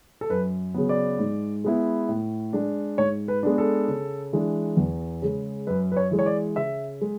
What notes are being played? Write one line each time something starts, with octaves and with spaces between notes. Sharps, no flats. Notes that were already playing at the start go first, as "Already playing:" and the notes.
A4
F#2 B4
C#3 F#3 B3
D5
G#2
G#3 B3 E4
A2
G#3 D4
G#2 C#5
B4
G#3 B3 D4
A4
C#3
E3 G#3 D4
E2
C#3 G#3
F#2 B4
B4
C#5
E3 G#3
C#5
D5
C#3 E5
G#3